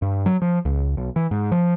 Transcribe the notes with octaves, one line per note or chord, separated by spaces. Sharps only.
G2
F#3
F3
C#2
B1
E3
G#2
F3